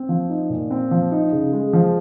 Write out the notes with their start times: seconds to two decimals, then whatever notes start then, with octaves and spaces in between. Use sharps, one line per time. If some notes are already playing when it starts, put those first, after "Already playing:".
Already playing: C4
0.09 F3
0.29 D#4
0.50 A#2
0.71 C4
0.91 F3
1.12 D#4
1.32 C#3
1.53 G#3
1.73 F3